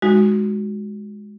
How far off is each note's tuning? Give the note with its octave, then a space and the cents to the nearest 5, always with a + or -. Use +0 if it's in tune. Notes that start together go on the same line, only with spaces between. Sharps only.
G#3 +0 D#4 +5 F#4 +0